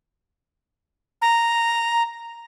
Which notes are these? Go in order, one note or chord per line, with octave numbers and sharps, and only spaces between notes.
A#5